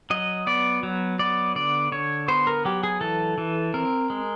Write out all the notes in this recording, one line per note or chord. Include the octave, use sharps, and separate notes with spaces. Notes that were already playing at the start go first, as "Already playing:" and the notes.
F#3 D#5
B3 D5
F#3
B3 D5
D3 D5
D3 C#5
B3 C5
A#4
F#3 G4
G#4
E3 A4
E3
C4 A#4
G#3